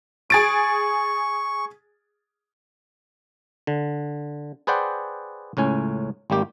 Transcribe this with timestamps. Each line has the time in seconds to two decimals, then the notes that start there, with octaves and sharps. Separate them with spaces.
0.30 G#4 C#6 A6 D7
3.67 D3
4.67 G#4 B4 C5 D5 F#5 G5
5.57 C#2 A2 C#4 G#5
6.30 G#1 G3 A#3 G4